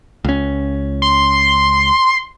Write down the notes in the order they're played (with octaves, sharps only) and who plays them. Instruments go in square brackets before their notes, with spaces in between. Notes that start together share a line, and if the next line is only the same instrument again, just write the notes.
[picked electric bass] C#2 C#4
[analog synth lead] C6